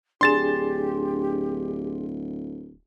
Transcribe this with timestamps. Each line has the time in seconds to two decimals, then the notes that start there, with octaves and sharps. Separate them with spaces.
0.21 D1 D4 G4 G#4 C6 A6 E7